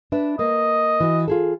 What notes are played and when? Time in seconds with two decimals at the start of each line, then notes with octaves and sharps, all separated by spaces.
0.12 D4 B4 E5
0.39 A#3 D#5
1.00 E3 F#4
1.28 F4 G#4 A4